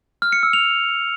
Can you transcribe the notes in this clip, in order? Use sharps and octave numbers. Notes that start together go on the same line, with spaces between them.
F6
C#7
E6
F7